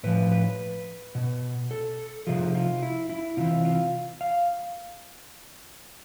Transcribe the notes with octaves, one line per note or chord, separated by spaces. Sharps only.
A2 F3 B4
B4
B2
A4
C3 F3 G#4
F4
E4
E4
C3 E3 F4
F4
F5